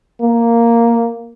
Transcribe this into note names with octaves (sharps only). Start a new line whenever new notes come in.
A#3